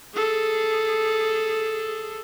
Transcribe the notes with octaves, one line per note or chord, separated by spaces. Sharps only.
G#4 A4